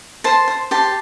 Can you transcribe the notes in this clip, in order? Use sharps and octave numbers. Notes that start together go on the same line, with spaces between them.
C5 A5 C6
C5
G4 A5 C6